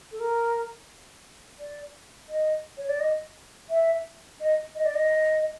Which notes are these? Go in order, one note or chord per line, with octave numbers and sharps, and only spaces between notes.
A4
A#4
D5
D#5
C#5
D5
D#5
E5
D#5
D#5
D5
D#5